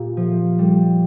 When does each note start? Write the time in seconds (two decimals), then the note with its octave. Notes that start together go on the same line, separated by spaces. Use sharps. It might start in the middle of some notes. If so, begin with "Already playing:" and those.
Already playing: A#2 F4 G4
0.17 F3
0.59 G3